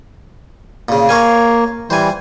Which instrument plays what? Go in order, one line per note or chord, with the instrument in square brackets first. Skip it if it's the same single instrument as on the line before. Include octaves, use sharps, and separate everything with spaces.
[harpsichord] A#2 C#3
[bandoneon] A#3 [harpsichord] C#5 F5 G#5
[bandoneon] E3 G3 [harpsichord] C5 G#5